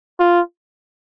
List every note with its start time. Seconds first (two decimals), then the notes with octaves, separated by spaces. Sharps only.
0.19 F4